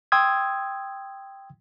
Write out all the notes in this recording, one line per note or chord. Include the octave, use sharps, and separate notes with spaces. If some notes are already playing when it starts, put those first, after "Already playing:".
G5 C6 D#6 E6 G#6